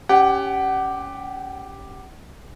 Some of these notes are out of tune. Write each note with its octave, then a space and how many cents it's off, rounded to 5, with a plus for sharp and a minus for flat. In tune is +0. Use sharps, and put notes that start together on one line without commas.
C#4 +15 G4 +0 F#5 +30